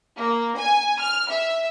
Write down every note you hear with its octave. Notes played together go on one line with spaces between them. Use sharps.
A#3
G#5
F6
E5